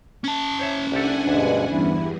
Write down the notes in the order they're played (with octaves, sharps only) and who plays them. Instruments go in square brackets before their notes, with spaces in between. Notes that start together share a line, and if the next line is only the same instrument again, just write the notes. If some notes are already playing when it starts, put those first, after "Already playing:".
[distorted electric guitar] C#4 A5
[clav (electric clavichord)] C5 C#5 E5
[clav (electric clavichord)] C2 G4 A4 [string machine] D4 F#5 G#5
[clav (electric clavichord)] D2 E5 [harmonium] G2 B2 G#3
[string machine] E2 G2 [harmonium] E4